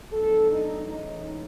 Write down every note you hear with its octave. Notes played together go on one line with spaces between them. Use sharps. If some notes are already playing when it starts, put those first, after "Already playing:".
A2 F#3 B3 D4 A4
D#4
A2 E3 G#3 C#4 D#4